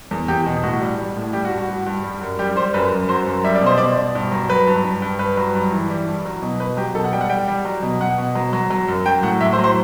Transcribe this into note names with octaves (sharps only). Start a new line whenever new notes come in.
E2
E2 G4
B2
A2 F#4
G3
G3
A2
G3 G4
F#4
G2
F#4
G2
G2
G3
F#2
G3 G4
G3 C5
F#2 B4
F#2
F#3 C5
F#2
G3 E5
D5
B2
C5
B2 D5
B2
G2
F#3
F#3 B4
G2
G2
G2
G2 B4
F#3
G2
E3
G3
G2
F#3
B2
B2 B4
F#3 G4
B2 A4
F#5
G3 G5
F#5
G3 G5
G3
F#3
B2
B2 F#5
B2
F#3
F#3
F#3
F#2
F#3 G5
A2 F#5
A2 E5
C5
F#3
C5